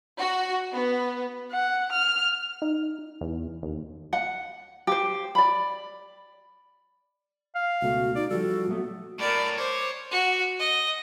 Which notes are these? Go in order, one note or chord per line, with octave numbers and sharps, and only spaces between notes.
F#4
B3
F#5
F6
D#4
E2
D#2
F#5
G4 C5
D5 B5
F5
C#2 B2 A3 F#4
D#4 D5
F3 G3 F#4 A4
A#2 F#3 A3 B3
A2 A#4 D5 B5
C5 C#5 D6
F#4
D#5